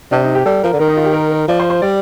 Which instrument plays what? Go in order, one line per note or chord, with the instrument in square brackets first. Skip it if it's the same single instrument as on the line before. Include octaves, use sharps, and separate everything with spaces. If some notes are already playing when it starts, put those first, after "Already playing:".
[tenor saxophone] C3 [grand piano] D4
[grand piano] D#4
G4
[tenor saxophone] G3 [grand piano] A4
[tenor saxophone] F3 [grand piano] A#4
[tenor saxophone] D3
[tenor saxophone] D#3 [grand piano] A#4
[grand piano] D#4
F4
G4
A#4
A#4
[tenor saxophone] F3 [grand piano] D5
[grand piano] C5
C5
[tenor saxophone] G3 [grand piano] D5